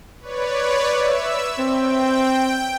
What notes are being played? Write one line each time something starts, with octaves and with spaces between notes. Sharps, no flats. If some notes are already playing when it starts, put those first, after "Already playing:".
B4 C#5 D5
E5 E6
C4 G5